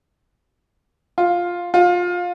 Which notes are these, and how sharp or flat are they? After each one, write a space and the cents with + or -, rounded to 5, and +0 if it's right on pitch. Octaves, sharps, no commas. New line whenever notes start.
F4 +5
F4 +20